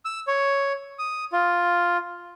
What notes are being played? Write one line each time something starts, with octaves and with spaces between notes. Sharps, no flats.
E6
C#5
D#6
F4